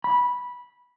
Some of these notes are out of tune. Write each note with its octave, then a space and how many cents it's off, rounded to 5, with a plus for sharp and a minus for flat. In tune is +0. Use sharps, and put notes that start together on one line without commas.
B5 -10